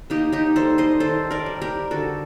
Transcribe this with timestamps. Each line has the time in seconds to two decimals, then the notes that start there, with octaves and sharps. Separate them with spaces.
0.10 A#3 D#4 G4
0.32 D#4 G4
0.56 G3 A4 C5
0.78 C5 D#5
1.00 D#3 A4 C5
1.31 A#4 D5
1.46 G3
1.62 G4 A#4
1.91 D3 F#4 A4